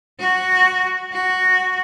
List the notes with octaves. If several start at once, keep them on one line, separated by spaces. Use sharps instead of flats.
F#4
F#4